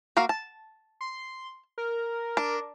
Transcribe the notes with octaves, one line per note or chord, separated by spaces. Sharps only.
A#3 F#4 F5
A5
C6
A#4
D4